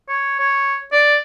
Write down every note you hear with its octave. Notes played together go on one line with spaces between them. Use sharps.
C#5
C#5
D5